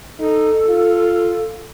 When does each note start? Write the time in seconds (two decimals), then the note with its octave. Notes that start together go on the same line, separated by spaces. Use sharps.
0.19 D#4 A4
0.69 F4